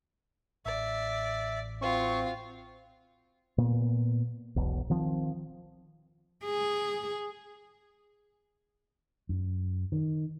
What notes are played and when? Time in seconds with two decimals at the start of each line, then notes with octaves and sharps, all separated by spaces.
0.66 A1 D5 E5
1.82 C4 F4 F#4 C#6
3.58 A#2 B3
4.56 E1 B1
4.90 D#3 F3 C4
6.45 G#4
9.29 F#2
9.92 D#3